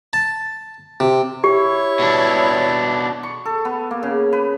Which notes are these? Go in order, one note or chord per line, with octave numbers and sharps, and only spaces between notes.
A5
C3
E4 G4 C#5
B2 D4
C#6
A4
B3
A#3
C#3
B4